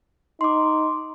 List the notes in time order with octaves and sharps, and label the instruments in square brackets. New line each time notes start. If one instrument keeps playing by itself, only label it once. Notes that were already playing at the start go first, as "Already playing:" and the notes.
[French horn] D#4 [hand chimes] C6 D6